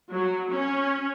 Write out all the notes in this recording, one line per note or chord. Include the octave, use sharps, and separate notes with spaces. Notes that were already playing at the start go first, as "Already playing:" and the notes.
F#3
C#4